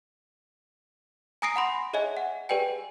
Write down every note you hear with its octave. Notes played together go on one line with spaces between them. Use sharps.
G#5 A#5 D#6 A#6 C7 D7
F#5 B5 C6
G#4 C#5 D#5 E5 G#5
F#5
G4 G#4 B4 D5 G5 G#5